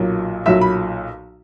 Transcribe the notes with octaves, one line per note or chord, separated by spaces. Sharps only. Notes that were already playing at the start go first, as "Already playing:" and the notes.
Already playing: B1 A#2 F#3
B1 A#2 F#3 E5
B5